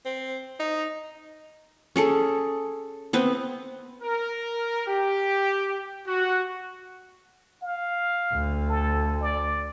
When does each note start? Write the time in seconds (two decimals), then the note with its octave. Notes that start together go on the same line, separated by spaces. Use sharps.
0.05 C4
0.60 D#4
1.96 C#4 G#4 A4
3.13 B3 C4 B4
4.02 A#4
4.87 G4
6.07 F#4
7.62 F5
8.33 D2
8.69 A4
9.21 D5